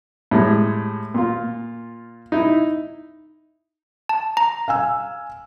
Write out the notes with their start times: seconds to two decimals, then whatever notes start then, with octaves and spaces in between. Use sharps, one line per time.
0.31 A2 G3 G#3
1.14 A#2 F4
2.32 D#4 E4
4.09 A5
4.37 A#5
4.68 F5 G#5 E6